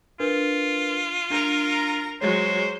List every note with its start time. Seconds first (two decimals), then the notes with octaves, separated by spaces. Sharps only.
0.20 D4 F4 A#4 B4
1.30 D4 A#4 A#5
2.21 F#3 G#3 C5 C#5